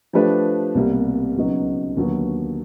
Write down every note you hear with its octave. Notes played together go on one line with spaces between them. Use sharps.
F3 A3 D4 G4 B4
C2 B2 G3 A#3
C#2 C#3 F#3 B3 D#4
D#2 D3 F#3 B3